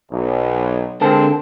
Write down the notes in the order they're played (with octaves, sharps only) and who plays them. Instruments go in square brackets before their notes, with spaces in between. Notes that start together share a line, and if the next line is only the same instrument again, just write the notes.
[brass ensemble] B1
[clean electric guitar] D3 A#4 A5 [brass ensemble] G#3 C4